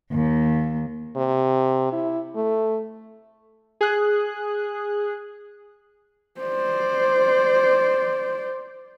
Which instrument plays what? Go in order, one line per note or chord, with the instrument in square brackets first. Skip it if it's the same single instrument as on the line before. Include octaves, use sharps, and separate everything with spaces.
[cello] D#2
[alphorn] C3
E4
A3
[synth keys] G#4 F#6
[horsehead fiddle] C5 D5